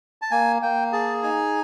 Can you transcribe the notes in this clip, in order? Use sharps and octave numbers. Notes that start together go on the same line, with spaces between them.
A5
A#3 G#5
A#3 G5
G#4 A5
D#4 G#5